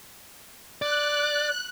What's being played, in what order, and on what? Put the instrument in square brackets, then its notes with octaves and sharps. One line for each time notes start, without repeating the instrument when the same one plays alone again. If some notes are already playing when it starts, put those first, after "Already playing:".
[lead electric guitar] D5 [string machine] F#6